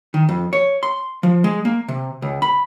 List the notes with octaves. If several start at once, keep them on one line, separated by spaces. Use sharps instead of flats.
D#3
F2
C#5
C6
F3
G#3
A#3
C3
C#2
B5